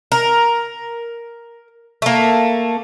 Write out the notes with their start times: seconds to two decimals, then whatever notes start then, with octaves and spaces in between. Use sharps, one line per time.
0.12 A#4
2.02 A3 A#3